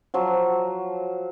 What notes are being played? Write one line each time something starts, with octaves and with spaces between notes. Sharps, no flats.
F3 F#3